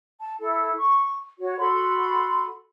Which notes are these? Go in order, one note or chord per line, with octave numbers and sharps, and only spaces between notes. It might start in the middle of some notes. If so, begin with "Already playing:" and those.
A5
E4 A4
C#6
F#4 C#5
F#4 A4 B5 C6